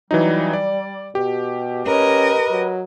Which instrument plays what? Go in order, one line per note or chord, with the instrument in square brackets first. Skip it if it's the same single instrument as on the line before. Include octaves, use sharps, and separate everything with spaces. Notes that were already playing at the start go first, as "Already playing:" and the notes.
[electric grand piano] E3 F#3 D#4 [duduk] G3
[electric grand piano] D5
[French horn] B2 [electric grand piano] G4
[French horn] C#4 [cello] A#4 D#5 [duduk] B4
[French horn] F#3